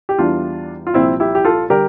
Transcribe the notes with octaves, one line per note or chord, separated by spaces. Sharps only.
G4
E2 E3 G3 D4 F4
F4
C2 A#2 F3 C4 E4
E4 G4
G4
F4 A4
D3 G3 G4 A#4